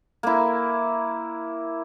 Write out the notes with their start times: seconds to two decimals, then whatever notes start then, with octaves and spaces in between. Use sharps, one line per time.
0.23 A#3 E4